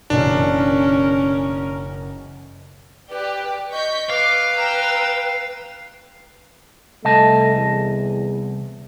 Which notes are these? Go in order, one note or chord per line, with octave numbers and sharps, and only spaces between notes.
F#1 B2 E3 C#4 D4 A#4
G4 B4 D5
D#5 C#6 G6 B6
B4 F5 D6
G5 A#5 E6
C2 A3 D#5 A5
E2